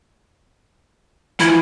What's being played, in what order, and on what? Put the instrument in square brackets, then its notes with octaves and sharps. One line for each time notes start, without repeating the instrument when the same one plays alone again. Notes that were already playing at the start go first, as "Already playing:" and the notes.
[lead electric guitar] E3 F3 [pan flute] E4